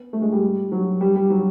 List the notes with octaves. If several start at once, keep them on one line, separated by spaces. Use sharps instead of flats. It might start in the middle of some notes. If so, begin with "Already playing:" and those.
Already playing: B3
A3
G#3
G3
F#3
G3
G3
F#3